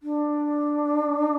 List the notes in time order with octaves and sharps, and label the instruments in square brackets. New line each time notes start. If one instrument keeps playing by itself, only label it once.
[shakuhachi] D4